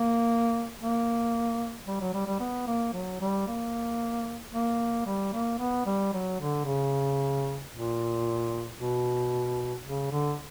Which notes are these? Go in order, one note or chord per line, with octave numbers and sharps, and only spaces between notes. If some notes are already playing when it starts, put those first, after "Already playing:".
Already playing: A#3
A#3
G3
F#3
G3
G3
B3
A#3
F#3
G3
A#3
A#3
G3
A#3
B3
G3
F#3
D3
C#3
A#2
B2
C#3
D3